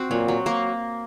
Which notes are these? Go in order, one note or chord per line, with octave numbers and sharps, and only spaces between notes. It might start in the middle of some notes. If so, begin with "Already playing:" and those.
Already playing: C4 F#4
A#2 F#3
F#3
A#3